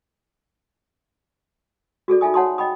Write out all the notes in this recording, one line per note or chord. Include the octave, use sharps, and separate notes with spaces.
F#4 G#4 A4 D5
D#4 F4 A4 E5 G#5 D#6
C#5 F#5 A5 C6 D#6
D#5 G5 B5 D#6